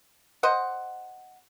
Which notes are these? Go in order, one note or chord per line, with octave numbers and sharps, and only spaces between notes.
C5 D#5 F#5